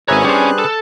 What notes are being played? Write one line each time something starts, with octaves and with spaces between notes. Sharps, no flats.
G#1 G#4 B4 C#5 E5 G#5 A#5 F#6
C2 G3 C#4 D4 C5
A4